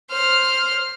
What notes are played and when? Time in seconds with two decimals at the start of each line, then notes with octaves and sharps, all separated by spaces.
0.11 C5 F6